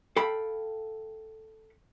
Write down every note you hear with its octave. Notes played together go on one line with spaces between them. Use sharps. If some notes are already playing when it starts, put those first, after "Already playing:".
A4 F5 G5 B5